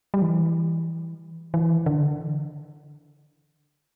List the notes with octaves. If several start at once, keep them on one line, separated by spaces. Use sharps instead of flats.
G3
E3
E3
D3